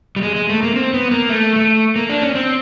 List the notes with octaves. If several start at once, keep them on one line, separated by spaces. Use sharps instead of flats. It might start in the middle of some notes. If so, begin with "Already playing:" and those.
G3
G#3
G#3
A3
A#3
C4
B3
A#3
A3
A3
A#3
D4
C#4
C4